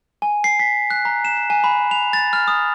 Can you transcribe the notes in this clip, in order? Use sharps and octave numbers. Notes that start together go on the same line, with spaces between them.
G#5
C7
B6
F#6
A#5
E7
G#5
B5
F7
A6
F6
D#6